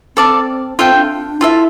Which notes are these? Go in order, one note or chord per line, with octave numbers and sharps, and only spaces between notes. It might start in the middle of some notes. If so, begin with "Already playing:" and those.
C4 A4 D5 F5 A5
C4 F4 A4 E5 G5
D4
E4 F4 A4 E5